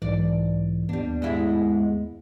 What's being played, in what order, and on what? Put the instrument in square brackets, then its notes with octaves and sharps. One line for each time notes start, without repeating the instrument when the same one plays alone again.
[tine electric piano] B1 G#2 E3 [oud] D5
[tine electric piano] D#2 B3 [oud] G3 D4
[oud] G#2 G#3 E4